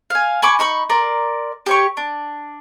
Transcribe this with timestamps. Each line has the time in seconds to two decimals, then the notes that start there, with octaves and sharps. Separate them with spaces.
0.10 F5 G#5
0.42 G#5 B5 C#6 D6
0.59 D#4 B5 C#6
0.90 A#4 D5 C6
1.66 G4 C#5 C#6
1.97 D4